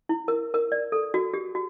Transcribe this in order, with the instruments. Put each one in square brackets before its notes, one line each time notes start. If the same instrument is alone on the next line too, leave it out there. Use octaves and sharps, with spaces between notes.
[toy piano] E4
A#4
A#4
D5
A4
F#4
G4
F#4